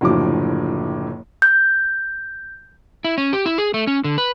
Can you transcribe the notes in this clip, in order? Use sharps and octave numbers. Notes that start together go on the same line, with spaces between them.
F#1 A2 D3 F3 F#3 D6
G6
E4
C#4
G4
E4
G#4
A3
C#4
D3
B4